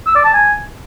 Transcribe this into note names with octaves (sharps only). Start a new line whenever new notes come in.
E6
D5
A5
G#5